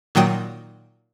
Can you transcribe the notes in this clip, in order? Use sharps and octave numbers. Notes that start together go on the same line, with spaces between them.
A#2 D#3 F#3 G5 D#6